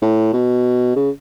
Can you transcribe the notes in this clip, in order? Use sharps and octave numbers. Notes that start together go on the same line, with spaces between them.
A2
B2
C#3